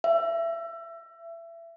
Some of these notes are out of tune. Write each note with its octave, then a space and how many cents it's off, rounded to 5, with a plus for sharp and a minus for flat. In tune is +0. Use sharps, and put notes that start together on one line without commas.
E5 +25